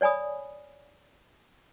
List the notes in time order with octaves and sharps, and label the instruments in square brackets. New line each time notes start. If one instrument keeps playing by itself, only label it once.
[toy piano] C#5 D5 G#5 B5 D#6